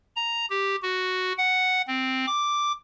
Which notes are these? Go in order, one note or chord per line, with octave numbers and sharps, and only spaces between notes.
A#5
G4
F#4
F#5
C4
D6